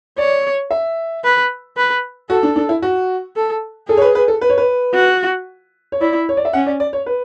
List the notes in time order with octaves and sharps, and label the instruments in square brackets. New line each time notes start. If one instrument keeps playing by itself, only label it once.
[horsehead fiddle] C#5 [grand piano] D5
[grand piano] E5
[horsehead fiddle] B4
B4
[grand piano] F#4 [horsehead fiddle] A4
[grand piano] D4
D4
E4
F#4
[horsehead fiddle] A4
[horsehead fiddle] G#4 [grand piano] A4
[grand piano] C#5
B4
B4
A4
B4
C#5
B4
[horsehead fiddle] F#4
[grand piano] C#5
[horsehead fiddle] E4 [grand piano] D5
[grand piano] C#5
D5
E5
[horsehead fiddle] C#4 [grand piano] F#5
[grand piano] D5
D5
C#5
B4